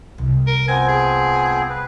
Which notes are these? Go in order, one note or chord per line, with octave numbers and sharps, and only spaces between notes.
C2
A#4
F3 B3 C4 G#5
G#4
B4